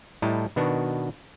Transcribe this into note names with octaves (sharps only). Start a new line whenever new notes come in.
A2 G3 E4 D#5 A5 A#5
B2 D#3 B3 D4 F#4